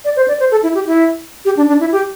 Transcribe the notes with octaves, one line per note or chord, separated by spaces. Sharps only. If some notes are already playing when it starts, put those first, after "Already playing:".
D5
C5
D5
C5
A4
E4
G4
E4
G4
D4
D4
E4
G4